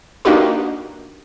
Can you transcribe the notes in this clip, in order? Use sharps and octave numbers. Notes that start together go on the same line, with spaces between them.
A#3 D4 D#4 F#4 G4 B4